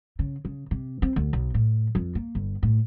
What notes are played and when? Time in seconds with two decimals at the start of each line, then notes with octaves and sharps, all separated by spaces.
0.19 C#3
0.45 C#3
0.71 C3
1.02 C4
1.16 D2
1.33 B1
1.54 A2
1.95 F2
2.15 A#3
2.35 G1
2.63 A2